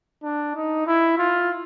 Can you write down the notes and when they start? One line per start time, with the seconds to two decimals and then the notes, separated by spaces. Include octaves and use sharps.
0.24 D4
0.55 D#4
0.87 E4
1.18 F4